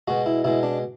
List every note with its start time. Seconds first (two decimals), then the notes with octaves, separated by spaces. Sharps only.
0.08 B2 G#3 F#4
0.26 E4
0.44 B2 G#3 E4
0.63 D4